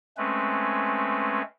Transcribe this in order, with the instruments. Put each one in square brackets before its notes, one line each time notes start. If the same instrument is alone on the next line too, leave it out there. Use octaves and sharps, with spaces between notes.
[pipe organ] G#3 A3 C4 C#4 B4